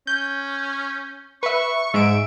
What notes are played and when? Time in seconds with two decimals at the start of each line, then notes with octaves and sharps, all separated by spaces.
0.07 C#4 G6
1.43 B4 E5 C#6
1.94 G#2 E5 D7